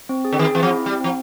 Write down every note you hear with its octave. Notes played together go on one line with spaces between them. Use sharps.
C4
G#4
D3
D#3 G#4
E3 C4
F3
E4
G3 C4
F3 C4